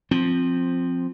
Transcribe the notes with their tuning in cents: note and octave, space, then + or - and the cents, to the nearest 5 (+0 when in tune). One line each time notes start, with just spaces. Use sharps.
F3 +5 C4 +0